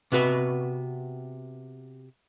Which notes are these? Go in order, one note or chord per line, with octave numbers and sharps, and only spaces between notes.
C3 B3 F#4 B4